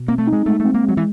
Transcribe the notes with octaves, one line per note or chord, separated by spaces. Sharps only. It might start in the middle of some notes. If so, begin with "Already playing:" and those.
Already playing: B2
A#3 C4
A3
D#4
G#3
G#3 A3
A3 C4
A#3
F#3 G#3
E3